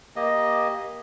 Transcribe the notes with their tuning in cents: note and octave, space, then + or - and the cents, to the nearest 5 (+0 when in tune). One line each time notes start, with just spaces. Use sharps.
A#3 +20 G4 +10 D#5 +0